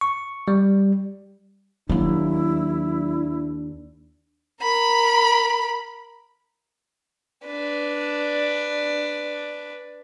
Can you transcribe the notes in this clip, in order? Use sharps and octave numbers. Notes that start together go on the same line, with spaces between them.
C#6
G3
D#2 F#3 A#3 D4 E4
A#4 B5
D4 B4